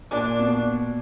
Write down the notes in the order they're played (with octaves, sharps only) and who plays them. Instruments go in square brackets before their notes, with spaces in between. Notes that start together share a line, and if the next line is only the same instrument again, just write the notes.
[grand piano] A#2 [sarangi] D4
[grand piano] B2